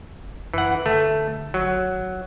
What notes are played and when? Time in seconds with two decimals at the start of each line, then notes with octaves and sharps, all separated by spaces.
0.23 F#1
0.54 F#2 E3 F#5
0.86 D3 A3
1.54 G#1 F#3